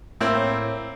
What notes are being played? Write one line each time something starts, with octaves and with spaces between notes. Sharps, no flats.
A2 A#3 C4 E4 C#5 G6